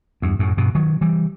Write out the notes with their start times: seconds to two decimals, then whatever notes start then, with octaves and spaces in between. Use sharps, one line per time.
0.22 E2 G2
0.39 F#2 A2
0.57 G2 B2
0.75 D#3 F#3
1.01 E3 G3